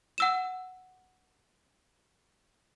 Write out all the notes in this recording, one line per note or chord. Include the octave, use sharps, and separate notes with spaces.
F#5 E6 E7